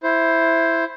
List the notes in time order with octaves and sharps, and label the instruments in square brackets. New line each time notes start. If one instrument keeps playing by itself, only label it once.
[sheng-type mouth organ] E4 C5